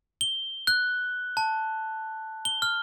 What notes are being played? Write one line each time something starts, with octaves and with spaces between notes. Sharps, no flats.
G7
F#6
A5
G7
F6